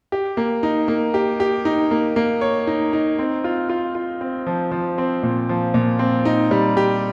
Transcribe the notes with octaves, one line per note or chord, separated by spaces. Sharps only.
G4
A#3
D#4
A#3
G4
G4
D#4
A#3
A#3
C#5
D#4
D#4
C4
F4
F4
F4
C4
F3
F3
C4
A#2
F3
A#2
C4
D#4
G3
G4